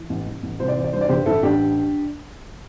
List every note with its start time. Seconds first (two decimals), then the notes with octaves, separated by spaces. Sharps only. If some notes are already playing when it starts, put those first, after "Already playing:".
Already playing: E3
0.09 A1
0.26 A1
0.43 A1
0.60 C2 C5
0.68 D5
0.76 E3 C5
0.84 D5
0.93 G2 C5
1.01 D5
1.09 G1 G4 C5
1.26 A1 E4 A4
1.43 A1 D4 G4